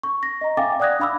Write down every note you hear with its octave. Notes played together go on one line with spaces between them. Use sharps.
C#6
A#6
D#5 A#5
E5 F5 G5 G#5 D6 A6
D5 F#5 D#6 F#6 G#6 A#6
D4 F5 B5 D6 E6